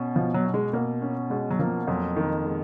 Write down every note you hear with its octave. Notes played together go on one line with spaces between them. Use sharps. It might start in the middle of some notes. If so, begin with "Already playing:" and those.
Already playing: B2 C#4
B2 F3
F#3
B2
G#3
B2 A#3
C#4
B2 G#3
F#3
F3 A#3
F2 F#3
D#3
G#3